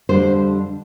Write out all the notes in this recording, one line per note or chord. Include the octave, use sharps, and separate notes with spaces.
F2 D3 G3 D4 C5